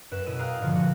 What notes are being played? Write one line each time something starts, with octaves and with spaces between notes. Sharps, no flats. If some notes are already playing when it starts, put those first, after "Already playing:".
F#2 B4 E7
B2 E4 E6 D#7
G#4 F5 G5 A#5 F6 F#6
G2 A#2 D3 F3
F#4